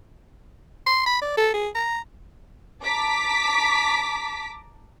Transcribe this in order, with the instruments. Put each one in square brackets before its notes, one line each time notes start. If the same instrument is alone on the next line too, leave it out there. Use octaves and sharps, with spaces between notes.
[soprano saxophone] C6
B5
D5
A4
G#4
A#5
[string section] A5 A#5 D6 B6